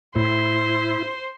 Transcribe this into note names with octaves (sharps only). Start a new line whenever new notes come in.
A2 E4 C5